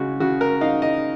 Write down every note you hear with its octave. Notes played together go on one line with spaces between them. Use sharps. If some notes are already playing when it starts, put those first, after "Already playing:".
Already playing: C#3 G#3 F#4
C#3 F#4
A#4
D#4 F5
D#5